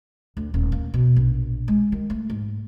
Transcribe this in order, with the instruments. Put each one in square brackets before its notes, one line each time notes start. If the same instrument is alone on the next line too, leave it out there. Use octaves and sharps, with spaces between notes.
[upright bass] D2
D#1
A#3
B2
A#1
G#3
D#3
A3
G#2